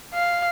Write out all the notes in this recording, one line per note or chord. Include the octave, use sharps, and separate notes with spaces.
F5